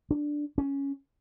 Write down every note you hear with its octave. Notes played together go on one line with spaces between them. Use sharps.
D4
C#4